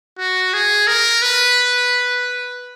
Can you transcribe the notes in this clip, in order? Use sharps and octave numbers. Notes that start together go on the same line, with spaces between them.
F#4
G#4
A#4
B4